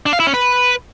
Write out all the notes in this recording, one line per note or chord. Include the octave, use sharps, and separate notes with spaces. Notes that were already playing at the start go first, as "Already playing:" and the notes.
D4
F5
E4
C#4
B4